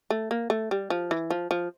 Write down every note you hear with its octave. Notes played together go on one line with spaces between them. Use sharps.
A3
A#3
A3
G3
F3
E3
F3
F3